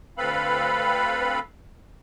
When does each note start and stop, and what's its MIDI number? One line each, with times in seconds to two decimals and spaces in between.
0.18 1.39 38
0.18 1.39 60
0.18 1.39 69
0.18 1.39 71
0.18 1.39 77
0.18 1.39 83